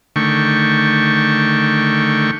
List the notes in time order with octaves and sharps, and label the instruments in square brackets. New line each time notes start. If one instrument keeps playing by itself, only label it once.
[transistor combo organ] D3 D#3 A3 G5 C#6